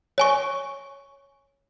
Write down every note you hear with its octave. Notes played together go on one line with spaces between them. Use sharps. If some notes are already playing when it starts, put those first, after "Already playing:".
C#5 G#5 C#6